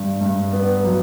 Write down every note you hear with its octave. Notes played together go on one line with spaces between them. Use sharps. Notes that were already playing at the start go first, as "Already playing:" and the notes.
Already playing: G2
G2
B3
F#3